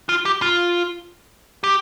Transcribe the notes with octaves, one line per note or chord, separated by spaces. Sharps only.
F4
G4
F4
G4